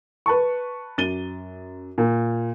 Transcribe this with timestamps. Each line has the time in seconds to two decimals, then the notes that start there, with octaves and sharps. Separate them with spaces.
0.26 B4 A5 C#6
0.98 F#2 A6 D#7 G7
1.98 A#2